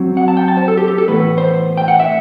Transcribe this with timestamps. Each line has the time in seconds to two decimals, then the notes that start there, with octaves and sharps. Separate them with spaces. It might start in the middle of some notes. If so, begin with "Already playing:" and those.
Already playing: F#2 F#3 C4
0.17 F#5
0.28 A5
0.37 G5
0.48 A5
0.57 C5
0.68 A4
0.77 G4
0.88 G4
0.98 A4
1.08 A2 E3 B3 B4
1.38 C5
1.77 G5
1.88 F#5
2.00 E5